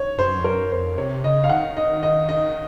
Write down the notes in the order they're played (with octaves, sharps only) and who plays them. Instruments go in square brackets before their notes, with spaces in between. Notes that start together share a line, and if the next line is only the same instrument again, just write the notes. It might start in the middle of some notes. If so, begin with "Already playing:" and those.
Already playing: [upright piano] C#5
[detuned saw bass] F#2 [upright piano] C5
[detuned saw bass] F2
[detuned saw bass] F#2 [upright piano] A#4
[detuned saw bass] F2 [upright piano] C5
[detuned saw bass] C3 [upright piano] C#5
[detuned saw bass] C#3 [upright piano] D#5
[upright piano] F5
[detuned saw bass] D#3 [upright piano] F#5
[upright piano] D#5
D#5
D#5